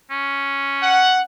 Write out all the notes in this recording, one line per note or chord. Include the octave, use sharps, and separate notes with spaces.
C#4
F#5